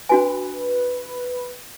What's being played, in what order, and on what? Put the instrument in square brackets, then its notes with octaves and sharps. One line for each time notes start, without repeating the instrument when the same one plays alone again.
[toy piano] D4 F#4 G#5 [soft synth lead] B4